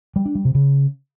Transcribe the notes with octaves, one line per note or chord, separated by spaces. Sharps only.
G3
D4
G3
C3
C#3